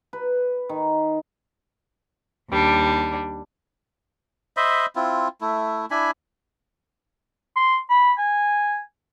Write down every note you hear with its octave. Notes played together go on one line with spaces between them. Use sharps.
B4
D#3
D#2 G3 D4
C5 D#5 E5 B5
C4 E4 F4
A3 E4
D4 E4 G#5 B5
C6
B5
G#5